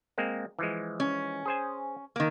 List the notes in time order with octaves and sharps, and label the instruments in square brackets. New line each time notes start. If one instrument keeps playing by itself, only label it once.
[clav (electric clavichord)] G#3 A#3 C4
E3 F3 G#3
[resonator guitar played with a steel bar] C#4
[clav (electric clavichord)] G#4 C5 G#5
[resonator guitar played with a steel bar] D#3 A#3